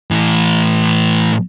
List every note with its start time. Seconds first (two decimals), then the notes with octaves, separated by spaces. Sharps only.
0.11 A2 E3